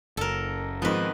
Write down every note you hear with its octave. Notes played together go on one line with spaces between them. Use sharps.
F#1 A4 A#4
G#2 D#3 F3 B3 C4 B4